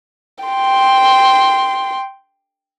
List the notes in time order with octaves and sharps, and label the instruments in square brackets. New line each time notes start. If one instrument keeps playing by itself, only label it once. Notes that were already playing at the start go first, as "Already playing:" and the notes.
[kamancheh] G5 C6